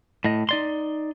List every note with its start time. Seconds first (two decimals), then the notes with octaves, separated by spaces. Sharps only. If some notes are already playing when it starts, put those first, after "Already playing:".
0.24 A2 D#5
0.49 D#4 D5 C6